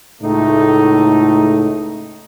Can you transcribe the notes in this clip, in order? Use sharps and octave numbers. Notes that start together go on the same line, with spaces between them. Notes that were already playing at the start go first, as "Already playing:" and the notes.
C#2 A2 A3 D#4